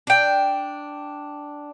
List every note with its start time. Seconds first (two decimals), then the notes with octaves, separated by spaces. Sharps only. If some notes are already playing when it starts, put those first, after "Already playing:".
0.07 D4 G5